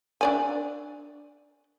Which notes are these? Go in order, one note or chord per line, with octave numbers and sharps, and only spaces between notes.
D4 D5 G#5